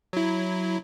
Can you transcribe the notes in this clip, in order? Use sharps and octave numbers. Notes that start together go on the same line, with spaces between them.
F#3 E4